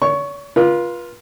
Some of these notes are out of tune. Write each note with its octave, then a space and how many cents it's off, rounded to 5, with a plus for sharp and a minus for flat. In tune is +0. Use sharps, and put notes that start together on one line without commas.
C#5 +45 C#6 +0
F4 +0 B4 -40